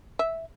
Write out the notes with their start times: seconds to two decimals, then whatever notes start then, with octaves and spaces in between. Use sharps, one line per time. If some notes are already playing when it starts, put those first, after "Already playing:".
0.19 E5